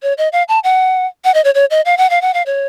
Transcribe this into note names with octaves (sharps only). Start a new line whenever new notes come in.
C#5
D#5
F5
A5
F#5
F#5
D#5
C#5
C#5
D#5
F5
F#5
F5
F#5
F5
C#5